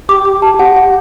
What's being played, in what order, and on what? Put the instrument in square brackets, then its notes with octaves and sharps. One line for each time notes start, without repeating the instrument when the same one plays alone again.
[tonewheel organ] G4 [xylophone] D6
[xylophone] D6
A5
[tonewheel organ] G4 [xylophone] F#5
[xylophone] F#5